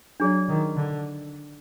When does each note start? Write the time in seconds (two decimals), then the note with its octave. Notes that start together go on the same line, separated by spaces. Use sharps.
0.20 F#3 D4 G#4 D5
0.49 D#3
0.76 D3